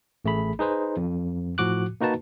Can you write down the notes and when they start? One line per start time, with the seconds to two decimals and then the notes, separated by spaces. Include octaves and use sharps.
0.25 A1 A3 G#4 B5
0.59 D#4 G#4 B4 C5
0.97 F2
1.58 A2 F3 F#4 D6 F#6
2.01 A#3 D#4 F#4 B4 A5